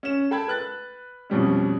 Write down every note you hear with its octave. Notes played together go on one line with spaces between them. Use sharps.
C#4 E7
A4 G5 A5 B5 G#6
B4 F#6 A6
F2 B2 G3 C#4